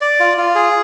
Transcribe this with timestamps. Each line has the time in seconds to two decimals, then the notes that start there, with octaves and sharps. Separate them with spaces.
0.01 D5
0.20 F4
0.38 F4
0.55 G#4